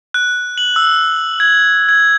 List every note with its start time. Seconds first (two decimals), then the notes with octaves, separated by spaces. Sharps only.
0.14 F#6
0.58 F#7
0.76 E6
1.40 G#6
1.89 G#6